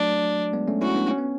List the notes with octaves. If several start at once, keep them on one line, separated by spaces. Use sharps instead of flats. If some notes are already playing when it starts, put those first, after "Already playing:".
Already playing: F#3 A3 D4
G#3 B3
A3 C#4
C#4 E4 F#4
B3 D4
C#4
B3